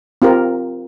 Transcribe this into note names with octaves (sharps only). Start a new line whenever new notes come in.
C4 F4 G4 A#4